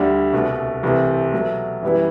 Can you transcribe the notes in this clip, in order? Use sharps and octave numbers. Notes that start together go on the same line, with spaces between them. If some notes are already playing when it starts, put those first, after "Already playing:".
Already playing: D2 D3 G3
C2 B2 A3
C2 C3 E3 A3 C4
B2 F#3 A3
F#2 E3 G3 B3 E4